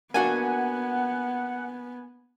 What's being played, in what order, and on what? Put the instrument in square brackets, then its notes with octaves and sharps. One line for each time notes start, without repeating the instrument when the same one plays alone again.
[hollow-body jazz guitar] A#3 D4 F#4 [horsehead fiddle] B3 [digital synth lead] F#5 [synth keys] G#5